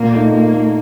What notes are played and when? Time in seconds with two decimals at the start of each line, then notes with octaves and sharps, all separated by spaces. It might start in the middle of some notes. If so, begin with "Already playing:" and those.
Already playing: A#2 A#3
0.12 A3 D#4
0.32 A#2 A#3
0.52 A3 D#4